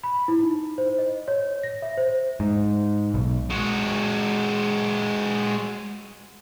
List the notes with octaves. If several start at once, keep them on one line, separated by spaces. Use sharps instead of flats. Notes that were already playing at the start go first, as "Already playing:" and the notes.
B5
E4
D#4
C5
D#5
C#5
A#6
E5
C5
G#2
B1
G#3 F#4